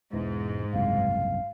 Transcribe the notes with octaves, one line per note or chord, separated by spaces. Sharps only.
E1 G#2 E3
F#1 C2 F5